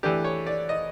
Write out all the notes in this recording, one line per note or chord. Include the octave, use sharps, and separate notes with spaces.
E3 A3 D4 G4
C#5
D5
D#5